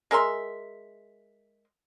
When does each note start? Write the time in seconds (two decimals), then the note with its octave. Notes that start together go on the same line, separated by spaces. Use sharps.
0.11 G#3 A#4 E5 C6